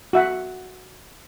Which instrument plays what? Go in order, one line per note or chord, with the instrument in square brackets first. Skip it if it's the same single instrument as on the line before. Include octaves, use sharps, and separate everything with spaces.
[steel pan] F#4 E5 F#5